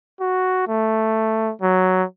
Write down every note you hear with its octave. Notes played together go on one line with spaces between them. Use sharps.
F#4
A3
F#3